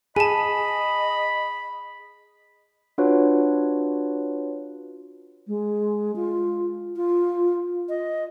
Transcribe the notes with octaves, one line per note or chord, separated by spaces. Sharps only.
G#4 D#5 G#5 A5 B5
D4 F4 F#4 B4 C#5
G#3
F4
F4
D#5